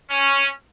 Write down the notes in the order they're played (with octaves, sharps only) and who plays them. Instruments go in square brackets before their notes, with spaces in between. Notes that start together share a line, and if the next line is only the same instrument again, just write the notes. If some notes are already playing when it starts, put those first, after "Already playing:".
[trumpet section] C#4